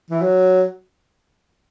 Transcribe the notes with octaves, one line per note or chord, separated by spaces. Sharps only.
E3
F#3